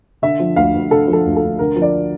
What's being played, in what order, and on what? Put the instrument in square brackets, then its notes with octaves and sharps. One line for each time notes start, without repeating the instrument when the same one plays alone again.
[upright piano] D3 E5
F3
D2 F5
D2
D3 A4
F3
A4
D2
A4
D2
D3 A#4
F3
D5